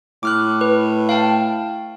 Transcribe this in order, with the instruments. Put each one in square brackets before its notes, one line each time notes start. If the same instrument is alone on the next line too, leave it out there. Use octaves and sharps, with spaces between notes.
[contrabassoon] A2 [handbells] D6 F6 F#6
[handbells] B4
F5 G5 A5